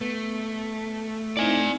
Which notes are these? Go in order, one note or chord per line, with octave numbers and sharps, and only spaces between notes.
A3 B3
C4 D#4 E4 D5 G#5